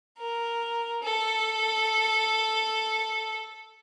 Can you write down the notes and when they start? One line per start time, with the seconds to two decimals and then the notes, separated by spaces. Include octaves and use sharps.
0.18 A#4
1.03 A4